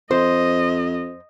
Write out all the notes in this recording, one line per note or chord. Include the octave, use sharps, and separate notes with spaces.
F2 C5 D#5